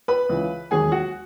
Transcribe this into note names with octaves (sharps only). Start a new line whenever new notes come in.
B4 B5
C#2 C#3 E3
E1 D#2 D#3 F#3 G#4 G#5
F#4 F#5